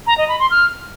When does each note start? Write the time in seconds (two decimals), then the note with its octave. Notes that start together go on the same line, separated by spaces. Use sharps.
0.07 A#5
0.18 D#5
0.29 B5
0.39 C6
0.50 F6